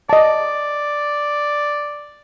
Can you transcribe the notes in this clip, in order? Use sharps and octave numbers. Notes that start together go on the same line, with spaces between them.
D5 D#5 A5